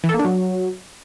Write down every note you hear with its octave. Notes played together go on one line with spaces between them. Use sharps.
E3
A4
A#3
D4
F#3